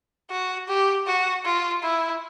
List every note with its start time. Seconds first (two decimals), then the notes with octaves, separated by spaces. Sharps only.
0.30 F#4
0.68 G4
1.07 F#4
1.45 F4
1.83 E4